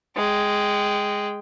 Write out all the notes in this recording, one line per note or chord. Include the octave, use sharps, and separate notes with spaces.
G#3 G5